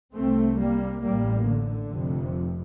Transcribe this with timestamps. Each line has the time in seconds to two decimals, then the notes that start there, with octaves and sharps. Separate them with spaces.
0.14 C2 C3 A3 C4
0.59 G3 A#3
1.03 A1 A2 G3 A#3
1.47 D3
1.91 F1 F2 C3